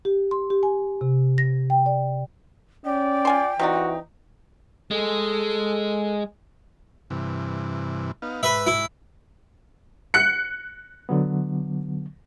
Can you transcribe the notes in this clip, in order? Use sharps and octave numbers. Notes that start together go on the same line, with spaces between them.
G4
C6
G4
G#5
C3
A#6
G5
D5
C#4 D5 G5
F4 G#5 C6
C3 E3 D#4 F#4 D5
G#3 A4
G2 C3 E3
B3 D#4 F5
G#2 B4 E5
E4
F#6 C#7
D3 F#3 B3